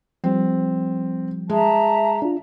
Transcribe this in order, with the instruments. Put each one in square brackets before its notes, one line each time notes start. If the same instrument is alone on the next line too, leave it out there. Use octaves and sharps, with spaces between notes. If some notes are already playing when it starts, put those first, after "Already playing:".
[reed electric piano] F3 G3 [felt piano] C4
[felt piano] G#3 [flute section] E5 A5 A#5
[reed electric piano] D4 F4